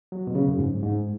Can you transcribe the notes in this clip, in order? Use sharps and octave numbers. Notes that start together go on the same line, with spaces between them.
F#3
B2
C#3
F#2
G#2
G#2